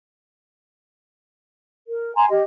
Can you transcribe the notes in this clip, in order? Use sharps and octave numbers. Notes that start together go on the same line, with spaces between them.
A#4
G#5 A#5 C6
G4 D#5